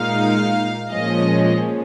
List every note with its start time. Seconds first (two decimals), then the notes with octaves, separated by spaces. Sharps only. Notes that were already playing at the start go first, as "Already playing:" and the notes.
Already playing: A#2 G#3 D#4 F5
0.91 A#2 F3 G#3 C#4 D#5